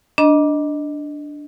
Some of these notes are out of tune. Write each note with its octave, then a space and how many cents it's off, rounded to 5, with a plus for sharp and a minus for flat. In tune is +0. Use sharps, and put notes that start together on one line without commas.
D4 +0 D#5 +0 A#5 +40